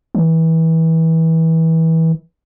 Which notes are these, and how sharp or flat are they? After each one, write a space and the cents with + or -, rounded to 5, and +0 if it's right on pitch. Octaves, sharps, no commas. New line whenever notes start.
E3 -25